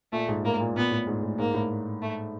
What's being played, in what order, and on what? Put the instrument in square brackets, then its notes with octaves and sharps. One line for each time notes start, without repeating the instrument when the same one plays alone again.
[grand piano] A#2 [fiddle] A3
[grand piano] G#2
[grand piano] A2 [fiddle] A#3
[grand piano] A#2
[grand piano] A#2 [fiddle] B3
[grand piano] A2
G#2
A2
[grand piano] G#2 [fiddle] A#3
[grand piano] A2
[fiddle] A3